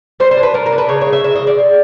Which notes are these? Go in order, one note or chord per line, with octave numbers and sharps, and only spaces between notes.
G3 C5
C5
D4
B4
D4 A#4
A#4
D4
B4
C#3 C#5
C#5
G#3
E5
E3 E5
D#5
G#3
D5
G#3